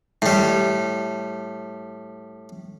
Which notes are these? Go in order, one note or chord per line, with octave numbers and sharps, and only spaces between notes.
A2 G3